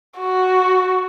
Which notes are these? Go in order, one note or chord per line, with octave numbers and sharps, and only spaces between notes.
F#4